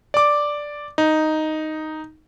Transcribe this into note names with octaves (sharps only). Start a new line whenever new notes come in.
D5 D6
D#4